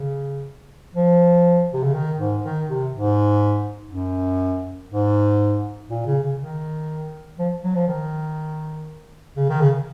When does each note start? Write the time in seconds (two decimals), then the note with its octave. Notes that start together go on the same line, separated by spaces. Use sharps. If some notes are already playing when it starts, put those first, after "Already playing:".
Already playing: C#3
0.95 F3
1.73 C3
1.84 C#3
1.94 D#3
2.19 G#2
2.43 D#3
2.68 C3
2.93 G#2
3.91 F#2
4.91 G#2
5.90 A#2
6.06 C#3
6.22 C#3
6.39 D#3
7.39 F3
7.63 F#3
7.75 F3
7.88 D#3
9.36 C#3
9.49 D#3
9.61 C#3